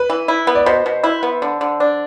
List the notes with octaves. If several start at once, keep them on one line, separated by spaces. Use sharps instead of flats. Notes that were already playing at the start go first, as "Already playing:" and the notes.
Already playing: B4
E3
E4
B3
D5
B2 C5
B2
E4
B3
D3
D3
D4